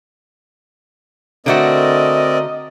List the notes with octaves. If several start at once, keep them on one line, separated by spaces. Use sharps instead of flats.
D3 A3 C4 F#4 A#4 D5 D#5